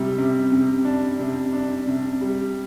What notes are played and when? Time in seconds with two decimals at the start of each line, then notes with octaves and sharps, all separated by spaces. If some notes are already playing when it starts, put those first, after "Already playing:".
Already playing: C3 G3
0.18 C3
0.52 C3
0.85 D4
1.19 C3
1.52 D4
1.86 C3
2.21 G3